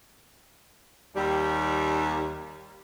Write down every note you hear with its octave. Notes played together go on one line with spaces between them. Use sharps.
D#2 G3